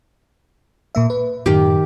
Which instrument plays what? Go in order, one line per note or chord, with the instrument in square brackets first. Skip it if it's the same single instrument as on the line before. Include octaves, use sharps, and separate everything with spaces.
[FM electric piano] A#2 A#3 E5
B4
[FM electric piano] F#2 A2 [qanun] D#3 G4